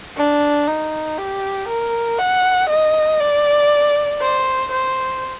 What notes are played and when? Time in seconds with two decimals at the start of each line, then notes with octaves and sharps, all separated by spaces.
0.17 D4
0.67 D#4
1.18 G4
1.68 A#4
2.19 F#5
2.70 D#5
3.20 D5
4.21 C5
4.72 C5